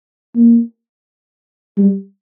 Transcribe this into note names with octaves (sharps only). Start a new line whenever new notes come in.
A#3
G3